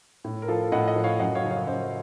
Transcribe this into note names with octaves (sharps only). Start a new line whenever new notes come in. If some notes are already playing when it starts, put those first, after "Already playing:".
A2
A#4
F3 F4 A4
A2 D#5 F#5
D#5 F#5
F3
C#5 F5
F#2 D#5 F#5
C#5 F5
C#3 F3
C#5 F5
F#2 C5 D#5